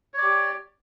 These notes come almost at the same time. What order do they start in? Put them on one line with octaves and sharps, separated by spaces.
C#5 D5 G4